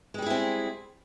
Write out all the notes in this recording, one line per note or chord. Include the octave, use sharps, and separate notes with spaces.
G3 G#3 C4 E4 G#4